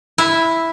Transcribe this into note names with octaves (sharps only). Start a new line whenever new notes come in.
E4